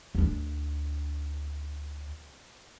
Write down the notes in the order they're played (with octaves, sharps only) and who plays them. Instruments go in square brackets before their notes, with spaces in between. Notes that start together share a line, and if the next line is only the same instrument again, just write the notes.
[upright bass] D2 D4